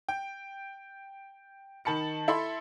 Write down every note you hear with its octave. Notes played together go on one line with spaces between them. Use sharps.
G5
D#3 A5 B5 C#7
E4 A4 E5 B5 C6